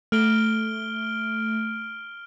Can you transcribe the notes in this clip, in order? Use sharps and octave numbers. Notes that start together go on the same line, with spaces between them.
A3 F6 D7 G7